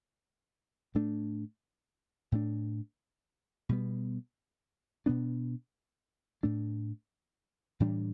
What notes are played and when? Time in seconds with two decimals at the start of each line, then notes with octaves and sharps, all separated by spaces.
0.95 A2 A3 D4
2.32 A2 A3 D4
3.69 B2 G3 B3
5.06 B2 B3 D4
6.43 A2 A3 D4
7.80 A2 E3 G3 D4